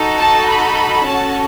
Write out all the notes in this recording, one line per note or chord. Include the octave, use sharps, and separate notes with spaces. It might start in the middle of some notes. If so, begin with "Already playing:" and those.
Already playing: D#4 F#4 A4
A5
B5
C#4 F#4 A4 A5